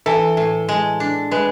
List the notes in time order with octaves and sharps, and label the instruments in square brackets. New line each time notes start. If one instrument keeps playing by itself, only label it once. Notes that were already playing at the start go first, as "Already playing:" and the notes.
[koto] E3 [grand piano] A4
[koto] A2
G#3
D4
[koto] G#3 [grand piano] B4